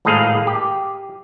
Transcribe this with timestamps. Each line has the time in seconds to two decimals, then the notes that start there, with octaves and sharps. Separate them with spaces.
0.05 G#1 A2 A#3 G#4 D#5 F5
0.47 G4